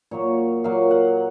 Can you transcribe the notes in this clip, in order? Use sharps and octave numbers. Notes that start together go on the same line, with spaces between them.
A#2 F#3 A#3 C#5
A#2 F#3 A#3 F5
F#5